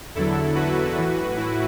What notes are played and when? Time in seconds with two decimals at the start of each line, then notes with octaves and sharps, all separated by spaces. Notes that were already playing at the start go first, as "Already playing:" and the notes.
0.15 E2 D3 F#3 E4 A4
0.55 F#4 B4
0.96 A2 E3
1.36 E4